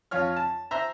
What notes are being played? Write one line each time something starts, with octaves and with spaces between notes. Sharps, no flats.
F2 F4 C#5 F6
A5
C5 E5 A#5